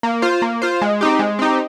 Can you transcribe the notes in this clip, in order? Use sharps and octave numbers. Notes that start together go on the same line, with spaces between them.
A#3
F4 C5
A#3
F4 C5
G#3
C4 D#4 G4
G#3
C4 D#4 G4